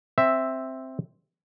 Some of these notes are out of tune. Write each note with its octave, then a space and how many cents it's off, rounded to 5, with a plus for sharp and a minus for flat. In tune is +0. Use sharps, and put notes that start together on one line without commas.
C4 +0 E5 +0